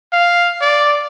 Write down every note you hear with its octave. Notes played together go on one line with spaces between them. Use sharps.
F5
D5